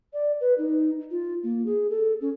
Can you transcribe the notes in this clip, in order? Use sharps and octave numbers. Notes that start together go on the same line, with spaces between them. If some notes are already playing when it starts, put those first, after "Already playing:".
D5
B4
D#4
F4
A#3
G#4
A4
C#4